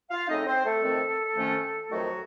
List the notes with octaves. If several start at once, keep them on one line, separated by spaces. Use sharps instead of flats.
F4 F5
C#3 A3 C4 D#4 D#5
C4 C5
A3 A4
F2 D#3 A3 C4
F2 D#3 A3 C#4
F2 D#3 F#3 A3 F#4